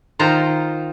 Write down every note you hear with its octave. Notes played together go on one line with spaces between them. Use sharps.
D#3 F4 C5 A#5